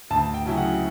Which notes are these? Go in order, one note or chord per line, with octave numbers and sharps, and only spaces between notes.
D2 A5
G5
C#3 F#3 C#4 E4
F#5